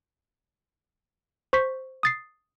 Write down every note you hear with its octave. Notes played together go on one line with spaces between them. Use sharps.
C5 C#6 G6 B6
D#6 A6 C7